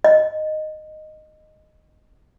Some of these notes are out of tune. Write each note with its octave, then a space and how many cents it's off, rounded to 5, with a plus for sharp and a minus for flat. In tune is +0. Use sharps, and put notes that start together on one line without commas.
D#5 -10